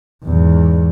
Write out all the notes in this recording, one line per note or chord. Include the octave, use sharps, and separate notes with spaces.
E2 G#2